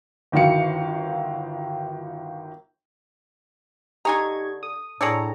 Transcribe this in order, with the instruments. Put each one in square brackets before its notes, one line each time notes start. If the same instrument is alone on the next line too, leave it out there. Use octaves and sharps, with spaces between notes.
[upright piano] G1 D#3 E4 F#4 F5 C#7
[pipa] D3 G#5 A#5 [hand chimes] D#4 G4 [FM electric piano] D#5 C#6 G#6
[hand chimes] A4 [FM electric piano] D#6
[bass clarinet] A2 [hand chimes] D4 [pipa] G#4 C#5 D5 [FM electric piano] A4 A#5